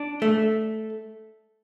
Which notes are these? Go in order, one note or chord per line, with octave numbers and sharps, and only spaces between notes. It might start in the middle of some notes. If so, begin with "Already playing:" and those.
Already playing: D4
A3